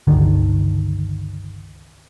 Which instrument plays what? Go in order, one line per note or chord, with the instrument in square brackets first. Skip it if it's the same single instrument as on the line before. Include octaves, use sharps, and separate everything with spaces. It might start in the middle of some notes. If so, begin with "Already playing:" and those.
[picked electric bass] G1 C#2 D3 D#3